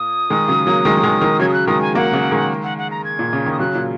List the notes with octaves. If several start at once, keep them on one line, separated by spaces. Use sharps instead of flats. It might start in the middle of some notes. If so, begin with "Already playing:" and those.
Already playing: A#2 D#6
D#3 G#3
C#3 F#3
F#3 A#3
D#3 G#3
F#3
D#3 G#3
D#3 G#3
C#3 F#3 G#6
D#6
F#6
D#3 G#3 D#6
G#5
F#3 A#3 F#5
C#3 F#3
D#3 G#3
F#5
F#5
A#5
G#6
A#2
C#3
D#3
D#6
C#3 F#3 F#6
A#2